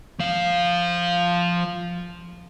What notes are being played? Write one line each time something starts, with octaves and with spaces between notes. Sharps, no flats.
F3 F5